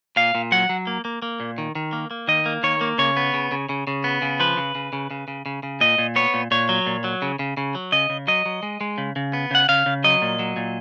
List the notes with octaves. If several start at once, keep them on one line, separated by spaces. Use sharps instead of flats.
A#2 F5
A#2
F#3 F#5
F#3
A#3
A#3
A#3
A#2
D#3
D#3
A#3
A#3
D#3 D#5
A#3
D#3 C#5
A#3
C#3 C#5
B3
C#3
C#3
C#3
C#3
B3
C#3
F3 B4
C#3
C#3
C#3
C#3
C#3
C#3
C#3
A#2 D#5
A#2
B3 C#5
A#2
A#2 C#5
F#3
A#2
F#3
C#3
C#3
C#3
F#3
C#3 D#5
C#3
F#3 D#5
F#3
G#3
G#3
C#3
C#3
B3
C#3 F#5
C#3 F5
C#3
F#3 D#5
A#2
F#3
A#2